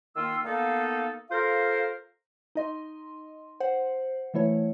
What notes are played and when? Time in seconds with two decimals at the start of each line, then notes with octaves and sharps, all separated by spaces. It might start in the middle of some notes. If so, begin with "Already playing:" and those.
0.16 D#3 A#3 F4 E6
0.44 A#3 B3 D#4 A4 F5
1.30 F4 A4 A#4 C5 F5
2.55 D#4 D#5 C6
3.60 C5 F#5
4.34 E3 A3 E4 C#5